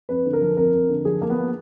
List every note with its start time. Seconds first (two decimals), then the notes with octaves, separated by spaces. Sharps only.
0.09 F2 B4
0.26 D3
0.33 A#4
0.41 F3
0.57 F2 A#4
0.73 F2
0.89 D3
1.05 F3 G#4
1.21 F3 A#3
1.30 B3